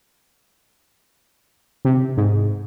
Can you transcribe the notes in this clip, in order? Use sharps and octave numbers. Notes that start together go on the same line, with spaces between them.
C3
G#2